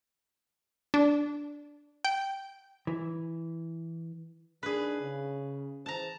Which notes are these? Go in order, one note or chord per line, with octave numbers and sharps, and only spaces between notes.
D4
G5
E3
D#3 D4 G#4 B4
C#3
E3 G#4 C5 A5 A#5